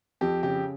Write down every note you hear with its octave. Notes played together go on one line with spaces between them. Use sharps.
F2 G4
C#3 G4